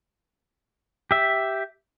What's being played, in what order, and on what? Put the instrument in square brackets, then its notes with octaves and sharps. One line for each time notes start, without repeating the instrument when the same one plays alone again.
[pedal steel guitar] G4 E5